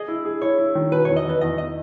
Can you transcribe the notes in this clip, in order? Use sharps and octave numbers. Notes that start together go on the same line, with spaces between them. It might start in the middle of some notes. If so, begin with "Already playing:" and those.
Already playing: G#4 D#5
E4
G#4
E4 C#5
E4
D#3
B2 B4
E2 C#5
D#5
E2 B4
E2 D#5
D#5